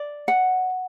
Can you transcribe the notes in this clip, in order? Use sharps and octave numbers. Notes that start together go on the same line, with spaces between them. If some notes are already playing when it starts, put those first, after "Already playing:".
Already playing: D5
F#5